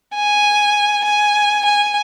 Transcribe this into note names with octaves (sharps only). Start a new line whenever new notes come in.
G#5
G#5
G#5